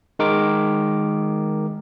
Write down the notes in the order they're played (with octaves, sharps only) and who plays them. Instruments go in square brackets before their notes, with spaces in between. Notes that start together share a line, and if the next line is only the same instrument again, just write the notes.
[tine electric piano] D#3 G#3 A#4 D6